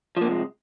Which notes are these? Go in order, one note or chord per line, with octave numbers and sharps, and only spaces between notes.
C3 F3 G#3 A#3